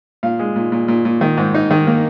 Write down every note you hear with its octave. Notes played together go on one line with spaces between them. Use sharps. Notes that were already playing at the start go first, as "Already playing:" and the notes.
A#2 F5
G#3
A#2
A#2
A#2
A#2
D#3
G#2
D#4
D#3
A#3